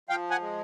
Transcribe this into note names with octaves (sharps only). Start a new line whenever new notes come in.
F3 F5 G5
F#5 G#5
G#3